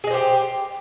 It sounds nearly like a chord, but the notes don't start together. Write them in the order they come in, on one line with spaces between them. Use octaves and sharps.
G#4 D#5 C5 G4